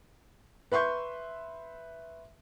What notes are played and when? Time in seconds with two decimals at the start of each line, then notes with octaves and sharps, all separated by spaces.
0.72 B4 E5 C6 C#6 G6